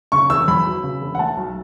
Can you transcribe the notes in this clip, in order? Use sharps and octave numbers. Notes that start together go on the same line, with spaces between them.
C#3 C#6
E1 E6
E2 B5
F#3
C#3
E1
F#5
A3 A5
B1